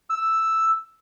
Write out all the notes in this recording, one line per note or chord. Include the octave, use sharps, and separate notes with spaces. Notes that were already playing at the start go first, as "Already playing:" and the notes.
E6